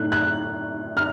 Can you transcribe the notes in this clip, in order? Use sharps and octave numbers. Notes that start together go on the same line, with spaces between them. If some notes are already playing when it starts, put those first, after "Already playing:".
Already playing: A2 A3 D#4 F#6
F#6
F6